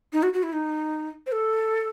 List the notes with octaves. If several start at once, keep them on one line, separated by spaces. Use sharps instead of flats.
D#4
F#4
F#4
E4
D#4
C5
A4